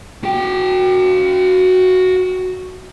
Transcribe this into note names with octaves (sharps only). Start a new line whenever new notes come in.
F#4 G5